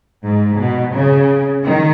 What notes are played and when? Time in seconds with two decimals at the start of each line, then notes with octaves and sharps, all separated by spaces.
0.24 G#2
0.58 B2
0.93 C#3
1.63 D#3